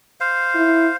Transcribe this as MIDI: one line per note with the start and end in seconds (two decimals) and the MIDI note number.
0.20 0.96 72
0.20 0.96 77
0.55 0.87 64